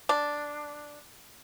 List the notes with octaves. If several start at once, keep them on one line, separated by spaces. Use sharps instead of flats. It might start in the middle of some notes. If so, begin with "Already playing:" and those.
D4